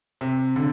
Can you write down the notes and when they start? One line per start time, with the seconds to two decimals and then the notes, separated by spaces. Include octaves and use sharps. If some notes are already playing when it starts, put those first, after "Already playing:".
0.21 C3
0.56 D3